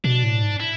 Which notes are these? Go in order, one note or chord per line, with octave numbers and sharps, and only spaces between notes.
B2 D4
A2
G#2
E4